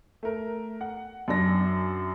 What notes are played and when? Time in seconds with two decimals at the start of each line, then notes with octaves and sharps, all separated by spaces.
0.23 A3 A#4
0.81 F#5
1.28 F#2 D4 A#6